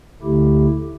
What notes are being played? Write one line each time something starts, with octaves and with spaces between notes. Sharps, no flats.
D2 D3 A3 E4 G4